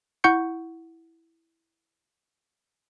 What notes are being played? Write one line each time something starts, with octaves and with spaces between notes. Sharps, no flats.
E4 F#5 C#6 G6 C#7